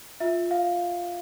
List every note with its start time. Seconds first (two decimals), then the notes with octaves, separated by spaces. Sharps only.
0.20 F4 E5
0.51 F5